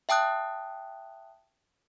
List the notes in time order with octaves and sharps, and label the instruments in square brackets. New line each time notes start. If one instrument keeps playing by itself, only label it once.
[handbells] E5 G5 A5 D#6 F#6